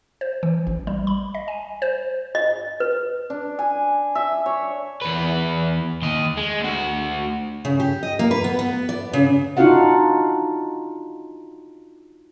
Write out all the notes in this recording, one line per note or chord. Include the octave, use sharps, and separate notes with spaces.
C5
E3
A1
G3
B5
D#5
G#5
C5
D#5
B4
D4
G#5
E5
C#5
E2 B4
D#2 D#5
G#3
D2 F#4
C#3
G4
D#5
A#3
B4
B3
B3
D5
C#3
D4 D#4 F4 F#4 F5 F#5